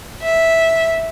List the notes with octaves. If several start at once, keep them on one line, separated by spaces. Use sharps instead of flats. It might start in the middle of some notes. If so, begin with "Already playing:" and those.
E5